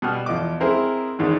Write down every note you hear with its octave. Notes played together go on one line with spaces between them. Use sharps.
B2 G3 F#5 F6
E2 F3 D#5 D6
G#3 C4 E4 G#4 A#4 C5
E2 G#2 D#3 G#3